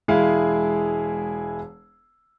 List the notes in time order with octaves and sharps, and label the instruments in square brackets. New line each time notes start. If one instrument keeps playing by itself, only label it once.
[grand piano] E1 G#3 E4 G#4 F5